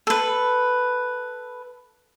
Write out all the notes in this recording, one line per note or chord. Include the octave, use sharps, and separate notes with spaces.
A4 B4